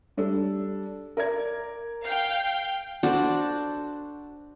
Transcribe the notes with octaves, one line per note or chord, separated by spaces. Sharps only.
G3 D4 A4
A#4 D5 G#6
F5 G5
D4 F#4 A4 C5